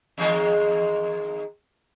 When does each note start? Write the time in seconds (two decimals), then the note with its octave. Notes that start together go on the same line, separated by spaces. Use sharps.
0.18 E2 D#3 G#3